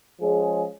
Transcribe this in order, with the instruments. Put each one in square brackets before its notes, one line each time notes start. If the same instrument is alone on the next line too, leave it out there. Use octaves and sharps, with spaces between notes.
[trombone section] F3 G#3 C#4 G#4